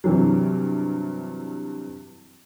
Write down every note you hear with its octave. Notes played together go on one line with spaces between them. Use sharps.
G2 C3 E3 F#3